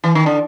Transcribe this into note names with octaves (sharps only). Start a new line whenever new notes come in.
E3
D#3
D3